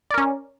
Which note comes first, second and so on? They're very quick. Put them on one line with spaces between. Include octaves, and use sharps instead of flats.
D5 A#4 C#4